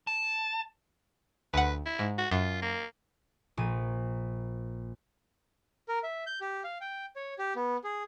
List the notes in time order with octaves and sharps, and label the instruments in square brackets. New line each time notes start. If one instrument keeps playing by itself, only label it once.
[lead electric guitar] A5
[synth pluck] D2 F#5 [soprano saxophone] B4
[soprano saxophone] E4
[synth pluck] G#2
[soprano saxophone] F#4
[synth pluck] F#2 [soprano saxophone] F4
[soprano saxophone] A#3
[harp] A#1 A#2 D#7
[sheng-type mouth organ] A#4
E5
G6
G4
F5
G5
C#5
G4
B3
G#4